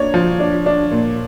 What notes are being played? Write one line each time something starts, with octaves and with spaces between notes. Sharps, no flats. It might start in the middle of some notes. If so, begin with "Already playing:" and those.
Already playing: A#3 D4 C#5
F3
D4
D4
A#2